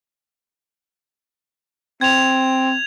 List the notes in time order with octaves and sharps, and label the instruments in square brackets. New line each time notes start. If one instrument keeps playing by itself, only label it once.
[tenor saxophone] C4 [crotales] G#6 F7